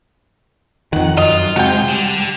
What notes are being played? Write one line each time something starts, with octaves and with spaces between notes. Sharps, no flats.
F2 D#3 F#5
F#2 F4 D#5
C3 G#3 F#4 G5
D3 G3